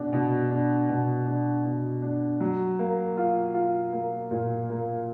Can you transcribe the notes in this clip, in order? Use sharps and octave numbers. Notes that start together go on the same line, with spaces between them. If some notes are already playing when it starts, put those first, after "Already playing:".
Already playing: B2 D4
B2
D4
B2
D4
B2
D4
F#3
A#3
F4
F4
A#3
A#2
A#3